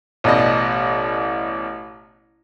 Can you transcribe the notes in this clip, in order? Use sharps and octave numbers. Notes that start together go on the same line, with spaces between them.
A1 B2 D5 D#5